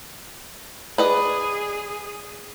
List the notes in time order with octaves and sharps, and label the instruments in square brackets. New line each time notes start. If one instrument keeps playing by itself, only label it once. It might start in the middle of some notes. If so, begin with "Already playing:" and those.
[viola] G#4 [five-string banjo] B4 D5 D#5